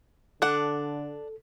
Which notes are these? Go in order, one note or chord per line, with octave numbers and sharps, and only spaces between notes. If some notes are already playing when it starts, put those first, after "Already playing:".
D3 D4 A4 F#5